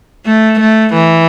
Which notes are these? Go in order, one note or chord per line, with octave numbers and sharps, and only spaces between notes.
A3
A3
E3